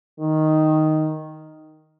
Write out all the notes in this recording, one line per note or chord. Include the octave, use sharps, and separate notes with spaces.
D#3